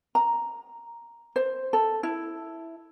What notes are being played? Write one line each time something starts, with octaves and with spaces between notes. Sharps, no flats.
A#5
C5
A4
E4